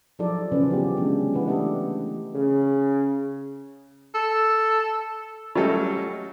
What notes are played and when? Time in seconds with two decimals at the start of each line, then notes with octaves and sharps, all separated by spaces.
0.19 F3 F#3 D#4 F4 A4 D5
0.52 C#3 E3 C#4 B4 D5
0.70 F#3 B3 D#4 F4 G4
0.97 C3 D#3 G#3 C#4 D4
1.33 E3 E4 B4 F#5
1.47 E3 A3 D4 G4 A4 D#5
2.34 C#3
4.15 A4
5.55 F#3 G3 A3 C#4 A4 D#5